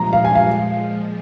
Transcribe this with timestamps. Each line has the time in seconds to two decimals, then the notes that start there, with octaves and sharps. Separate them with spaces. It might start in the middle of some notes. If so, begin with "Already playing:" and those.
Already playing: A#2 F3 G#3 A#5
0.13 F5
0.25 G#5
0.35 F5